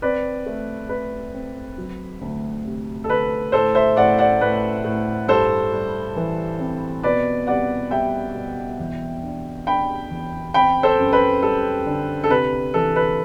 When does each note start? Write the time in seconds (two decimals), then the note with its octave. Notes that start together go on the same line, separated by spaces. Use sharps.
0.02 C4 B4 D5
0.46 A3
0.89 A3 B4
1.34 C4
1.78 F#3
2.21 D2
2.65 C3
3.04 A4
3.08 D2 B4
3.52 A2 A4 C5
3.75 C5 E5
3.96 A2 D5 F#5
4.19 D5 F#5
4.41 A2 B4
4.84 A2
5.28 G2 A4 C5
5.73 G3
6.17 E3
6.59 C4
7.03 B2 B4 D5
7.47 C2 D5 F#5
7.91 G3 E5 G5
8.35 B2
8.79 E2
9.23 D4
9.67 D4 G5 B5
10.11 E2
10.54 C4 G5 B5
10.83 A4 C5
10.98 F#2
11.13 B4
11.42 G3 A4
11.86 D3
12.24 A4
12.29 C3 B4
12.74 E3 A4
12.96 B4